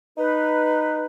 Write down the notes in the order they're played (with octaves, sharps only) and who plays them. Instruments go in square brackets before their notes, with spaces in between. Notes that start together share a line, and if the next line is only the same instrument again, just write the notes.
[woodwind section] D#4 B4